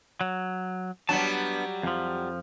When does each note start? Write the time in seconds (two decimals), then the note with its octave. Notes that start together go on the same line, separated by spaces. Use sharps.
0.21 F#3
1.09 F#3 G3 B3 D4 A5
1.83 F2 F3